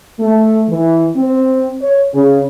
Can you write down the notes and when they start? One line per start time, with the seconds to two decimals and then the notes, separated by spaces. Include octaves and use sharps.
0.19 A3
0.69 E3
1.16 C4
1.82 C#5
2.14 C#3